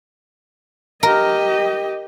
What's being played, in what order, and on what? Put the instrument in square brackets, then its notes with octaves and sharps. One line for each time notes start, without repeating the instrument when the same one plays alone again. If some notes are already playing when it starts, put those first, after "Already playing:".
[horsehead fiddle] G4 D#5 [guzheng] A#4